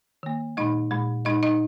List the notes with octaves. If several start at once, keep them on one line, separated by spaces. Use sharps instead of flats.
D#3 A#3
A#2 G#3 D#4 D#5
A#2 G#3
A#2 G#3 D#4 D#5
D#4 D#5